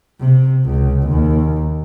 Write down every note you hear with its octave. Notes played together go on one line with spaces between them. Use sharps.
C3
C#2
D#2